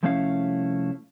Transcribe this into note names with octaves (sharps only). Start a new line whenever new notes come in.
C2 F3 A3 C#4 E4 F5